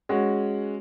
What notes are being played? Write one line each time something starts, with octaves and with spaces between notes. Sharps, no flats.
G#3 C#4 F#4